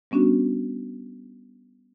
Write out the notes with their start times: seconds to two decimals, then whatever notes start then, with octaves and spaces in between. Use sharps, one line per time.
0.11 G3 B3 C#4 D4 F#4